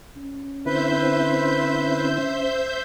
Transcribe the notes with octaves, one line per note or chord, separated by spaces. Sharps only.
C#4
D3 C4 E4 B4 C5 E5 G6